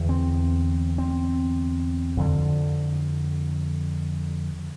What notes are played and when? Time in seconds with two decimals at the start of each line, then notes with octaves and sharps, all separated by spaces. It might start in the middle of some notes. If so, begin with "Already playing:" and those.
Already playing: E2 D3
0.09 C4
0.98 C4
2.17 F2 D3